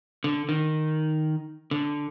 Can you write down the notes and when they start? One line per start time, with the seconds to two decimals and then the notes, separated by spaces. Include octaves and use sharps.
0.24 D3
0.49 D#3
1.71 D3